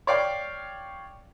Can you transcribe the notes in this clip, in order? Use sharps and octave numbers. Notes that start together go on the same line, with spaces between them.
C#5 D5 F5 G5 D6